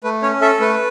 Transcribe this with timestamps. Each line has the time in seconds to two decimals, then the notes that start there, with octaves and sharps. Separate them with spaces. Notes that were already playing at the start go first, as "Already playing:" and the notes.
0.04 A3 B4
0.22 C#4 C#5
0.41 A4 E5
0.60 A3 B4